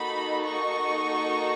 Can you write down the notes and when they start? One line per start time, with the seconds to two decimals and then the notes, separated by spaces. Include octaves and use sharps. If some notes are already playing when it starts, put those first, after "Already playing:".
Already playing: A#3 D#4 F#4 A4 B5
0.44 C#6